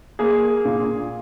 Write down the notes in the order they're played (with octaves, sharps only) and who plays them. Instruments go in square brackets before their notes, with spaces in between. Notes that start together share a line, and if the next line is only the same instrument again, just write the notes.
[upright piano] A#3 G#4
A#2